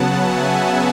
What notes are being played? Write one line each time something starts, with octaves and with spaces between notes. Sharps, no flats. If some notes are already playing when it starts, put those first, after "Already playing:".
Already playing: C#3 F#3 B3 F#5 A5
E5 G#5